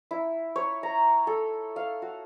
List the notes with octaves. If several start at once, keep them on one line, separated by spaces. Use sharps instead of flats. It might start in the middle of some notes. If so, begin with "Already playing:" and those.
E4
C#5
A#5
A4
F5
F#4